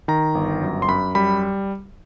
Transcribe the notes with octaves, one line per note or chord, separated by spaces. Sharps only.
D#3 A#5
G1
F#2
C6
F#2 B5
G3 B5